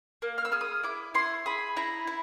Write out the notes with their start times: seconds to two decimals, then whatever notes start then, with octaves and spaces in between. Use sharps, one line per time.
0.22 A#3
0.38 F6
0.45 E6
0.52 G#4 F6
0.61 D#6
0.83 E4 D6
1.14 E4 C6
1.46 G#4 B5
1.77 E4 A#5
2.07 E4